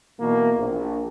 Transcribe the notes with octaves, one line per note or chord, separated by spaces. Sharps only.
B1 B2 E3 A#3
A#1